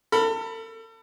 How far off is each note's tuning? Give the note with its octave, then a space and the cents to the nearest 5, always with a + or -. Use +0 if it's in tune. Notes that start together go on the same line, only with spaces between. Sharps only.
A4 +40 B5 +0